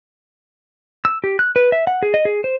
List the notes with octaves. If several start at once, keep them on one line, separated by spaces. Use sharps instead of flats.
E6
G4
F#6
B4
E5
F#5
G#4
D#5
G#4
C5